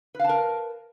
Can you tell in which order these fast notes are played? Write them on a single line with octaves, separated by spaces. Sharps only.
B4 F5 A5 A#4